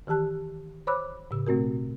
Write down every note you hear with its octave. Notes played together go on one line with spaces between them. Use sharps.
D#3 E3 G4 A5 F#6
C5 C#5 B5 D6 E6 F#6
A2 C#3 E6
B2 A3 C4 F#4 A#4